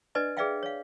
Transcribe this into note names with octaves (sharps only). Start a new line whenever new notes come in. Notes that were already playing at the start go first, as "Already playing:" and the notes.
D4 B4 D5 D#5 G#5
G#4 B4 D5 E5 F5 G5
C#5 F5